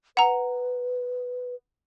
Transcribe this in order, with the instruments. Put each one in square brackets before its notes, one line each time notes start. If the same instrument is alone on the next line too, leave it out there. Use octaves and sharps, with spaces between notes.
[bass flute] B4 [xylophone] F#5 A#5